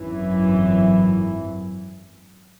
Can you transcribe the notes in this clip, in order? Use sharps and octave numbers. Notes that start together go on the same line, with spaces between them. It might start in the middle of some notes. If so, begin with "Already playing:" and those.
Already playing: G#1 F#2 E3